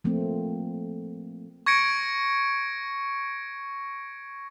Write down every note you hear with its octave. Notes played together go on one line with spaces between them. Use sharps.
F3 A3 A#3 C4
C#6 G#6 A#6 C#7 D7